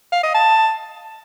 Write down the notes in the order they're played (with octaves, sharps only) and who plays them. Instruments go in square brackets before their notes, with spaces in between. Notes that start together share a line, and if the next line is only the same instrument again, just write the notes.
[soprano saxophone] F5
D#5
A5